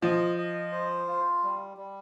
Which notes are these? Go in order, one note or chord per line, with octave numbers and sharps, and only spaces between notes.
F3 D#5
D#5
C5
F4
G3
G3